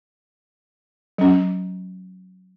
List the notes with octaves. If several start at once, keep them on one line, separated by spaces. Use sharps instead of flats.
F#3 C#4